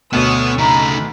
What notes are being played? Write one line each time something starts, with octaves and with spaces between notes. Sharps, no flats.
D2 B2 B3 C#5 D#6 E6
C#3 D#4 A#5 B5